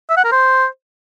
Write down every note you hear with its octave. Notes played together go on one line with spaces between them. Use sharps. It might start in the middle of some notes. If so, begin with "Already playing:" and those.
E5
F#5
A#4
C5